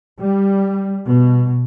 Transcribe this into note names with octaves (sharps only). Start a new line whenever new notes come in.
G3
B2